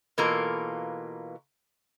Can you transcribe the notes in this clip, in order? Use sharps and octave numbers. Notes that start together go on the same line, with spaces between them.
B2 E3 A#3 F4 A4 A#4